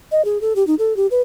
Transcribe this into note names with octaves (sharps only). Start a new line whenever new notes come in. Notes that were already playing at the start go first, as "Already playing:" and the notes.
D#5
G#4
A4
G4
D#4
A4
G4
B4